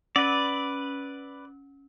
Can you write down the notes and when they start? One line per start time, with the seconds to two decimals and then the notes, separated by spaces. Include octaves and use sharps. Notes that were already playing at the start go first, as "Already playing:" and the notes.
0.16 C#4 B4 D5